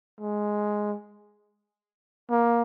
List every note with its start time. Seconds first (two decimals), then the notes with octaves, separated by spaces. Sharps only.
0.21 G#3
2.30 A#3